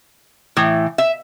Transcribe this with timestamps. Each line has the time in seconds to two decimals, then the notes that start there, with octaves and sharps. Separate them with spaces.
0.57 A2 E3
0.98 E5